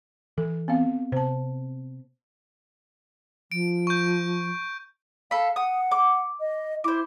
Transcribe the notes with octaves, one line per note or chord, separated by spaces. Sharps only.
E3 A4
B3 C4 F5
C3 C5 A5
F3 D7
C#6 G6
A4 F5 B5
F#5 D#6
D6
D#5
E4 C5 D6